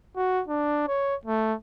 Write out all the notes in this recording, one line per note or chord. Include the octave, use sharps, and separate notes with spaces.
F#4
D4
C#5
A3